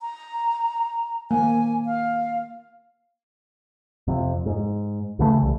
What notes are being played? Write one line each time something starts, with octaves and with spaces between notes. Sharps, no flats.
A#5
A#3 G#5
F5
F2 C3
G#2
D2 C#3 E3 A3
C2